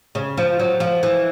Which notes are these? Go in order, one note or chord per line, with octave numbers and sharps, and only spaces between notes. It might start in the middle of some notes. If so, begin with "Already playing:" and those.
C#3
F3
F#3
F3
E3